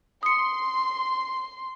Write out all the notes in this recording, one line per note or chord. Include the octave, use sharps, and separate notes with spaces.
C6 D#6 C#7